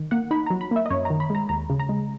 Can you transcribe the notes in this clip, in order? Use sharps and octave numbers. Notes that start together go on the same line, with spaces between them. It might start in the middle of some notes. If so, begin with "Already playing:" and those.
Already playing: D#3
A#3 F#5
D#4 B5
F#3 A#5
B5
A#3 E5
D#5
F#2 C#5
D#3 A#5
B5
G#3 A#5
D#2 A#5
C#3
A#5
G#3